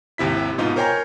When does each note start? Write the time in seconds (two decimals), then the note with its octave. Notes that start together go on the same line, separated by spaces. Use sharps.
0.18 G#1 D#2 C3 E4 B6
0.58 G#2 B2 D#4 F4
0.76 A#4 C5 C#5 G5 G#5 A#5